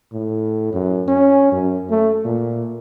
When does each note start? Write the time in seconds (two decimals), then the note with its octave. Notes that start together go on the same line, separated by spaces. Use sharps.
0.13 A2
0.73 F#2
1.08 C#4
1.52 F#2
1.91 A3
2.25 A#2